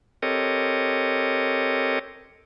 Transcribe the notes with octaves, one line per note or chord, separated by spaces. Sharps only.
C4 G4 A4 A#4 C#5 D#5